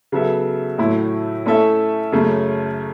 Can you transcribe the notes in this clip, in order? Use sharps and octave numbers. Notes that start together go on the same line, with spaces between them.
C#3 F#3 B3 A4 E5
A2 F#3 A3 E4
A3 C#4 E4 A4 E5
F#2 C#3 A3